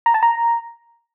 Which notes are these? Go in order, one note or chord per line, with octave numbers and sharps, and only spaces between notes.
A#5
A5
A#5